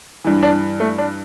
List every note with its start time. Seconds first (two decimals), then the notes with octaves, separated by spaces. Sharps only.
0.24 G2 E3
0.43 D4
0.80 A3
0.98 D4